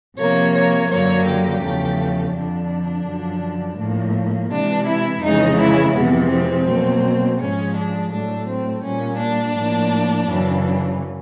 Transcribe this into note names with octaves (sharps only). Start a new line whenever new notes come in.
C3 F3 A#3 C#5
C#5
F#2 D3 F#3 A#3 C#5
G4
E2 C#3 F3 A3
F2 D3 F3 D4
F#2 D3 F3
A2 F3 A#3
C3 E3 G#3 D4
E4
F2 C#3 E3 G#3 D#4
E4
F2 C3 E3 G#3 B3
C4
B2 F#3 A#3
G#2 F3 G#3 C#4
D4
A2 F#3 A3 D4
C4
A#2 G3 A#3 C#4
D4
A2 F3 A#3
F#2 C#3 E3